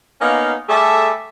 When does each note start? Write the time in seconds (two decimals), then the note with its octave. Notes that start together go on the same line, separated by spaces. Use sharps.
0.21 A#3 B3 C#4 D#4 F5
0.68 G3 A3 G#4 A4 E5 A5